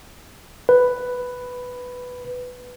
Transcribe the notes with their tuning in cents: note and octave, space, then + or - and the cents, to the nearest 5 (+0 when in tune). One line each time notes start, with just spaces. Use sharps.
B4 +5